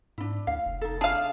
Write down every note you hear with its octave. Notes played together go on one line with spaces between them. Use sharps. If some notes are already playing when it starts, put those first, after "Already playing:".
G#2 D4 E4
D2 F5
F1
D#4 A4
D4 G#4 F5 A5